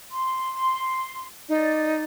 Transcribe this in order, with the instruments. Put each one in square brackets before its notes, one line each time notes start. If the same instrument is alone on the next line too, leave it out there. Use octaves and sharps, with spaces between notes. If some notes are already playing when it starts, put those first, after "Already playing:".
[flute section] C6
[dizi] D#4 [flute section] D5